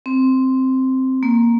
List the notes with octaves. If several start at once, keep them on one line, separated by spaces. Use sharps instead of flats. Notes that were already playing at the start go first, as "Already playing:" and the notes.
C4
A#3